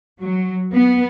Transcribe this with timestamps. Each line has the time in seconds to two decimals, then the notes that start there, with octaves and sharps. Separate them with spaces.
0.19 F#3
0.71 B3